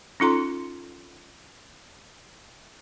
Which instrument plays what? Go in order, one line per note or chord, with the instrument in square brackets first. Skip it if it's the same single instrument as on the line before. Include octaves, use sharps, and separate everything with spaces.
[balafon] C#4 D#4 F4 A4 A#5 C6